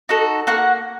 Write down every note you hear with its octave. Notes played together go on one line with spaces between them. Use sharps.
D#4 F#4 A4
A#3 F#4 F#5